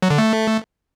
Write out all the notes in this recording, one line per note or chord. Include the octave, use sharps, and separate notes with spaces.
F#3
D3
A3